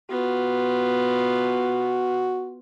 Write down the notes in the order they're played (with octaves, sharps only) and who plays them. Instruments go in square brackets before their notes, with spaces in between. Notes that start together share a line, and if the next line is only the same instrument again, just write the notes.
[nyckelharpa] B3 F4 [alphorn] F#4